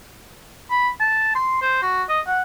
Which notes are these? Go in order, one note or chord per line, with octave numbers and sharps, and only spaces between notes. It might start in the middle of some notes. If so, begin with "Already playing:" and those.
B5
A5
C6
C5
F#4
D#5
F#5